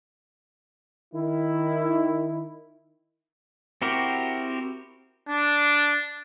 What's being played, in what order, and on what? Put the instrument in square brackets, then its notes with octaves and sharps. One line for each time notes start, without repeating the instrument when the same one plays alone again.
[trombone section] D#3 E4
[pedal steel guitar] C4 E4 F#4 G4 A#4
[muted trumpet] D4